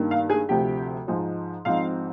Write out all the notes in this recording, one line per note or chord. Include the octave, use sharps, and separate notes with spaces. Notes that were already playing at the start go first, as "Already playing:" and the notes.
Already playing: G2 D#3 A#3
F5
G#4 G#5
D2 C3 F3 G4 G5
G#2 F3 G#3 D#4
G#1 G#2 F3 C4 D#4 F5